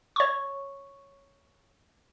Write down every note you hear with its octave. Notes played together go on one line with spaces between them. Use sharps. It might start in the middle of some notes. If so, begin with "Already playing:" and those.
C#5 C#6